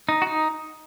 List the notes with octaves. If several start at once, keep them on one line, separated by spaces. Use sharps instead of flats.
D#4
F#4
D#4